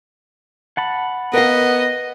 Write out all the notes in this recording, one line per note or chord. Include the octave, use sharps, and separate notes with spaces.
F#5 A5 B5
B3 A#4 D#5 F5